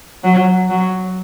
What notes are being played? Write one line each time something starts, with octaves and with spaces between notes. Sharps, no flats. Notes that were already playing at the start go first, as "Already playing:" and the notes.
F#3
F#3